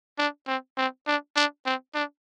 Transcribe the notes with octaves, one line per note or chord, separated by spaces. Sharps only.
D4
C4
C4
D4
D4
C4
D4